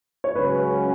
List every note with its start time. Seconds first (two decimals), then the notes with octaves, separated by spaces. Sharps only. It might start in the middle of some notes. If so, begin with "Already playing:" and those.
0.24 C#5
0.36 C#2 C#3 F#3 C#4 B4